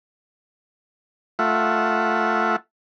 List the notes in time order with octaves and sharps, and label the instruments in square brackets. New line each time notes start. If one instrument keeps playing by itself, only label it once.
[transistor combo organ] A3 F4 E5 F#5